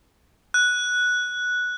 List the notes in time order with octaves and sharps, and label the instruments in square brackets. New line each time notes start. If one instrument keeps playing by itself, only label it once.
[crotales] F#6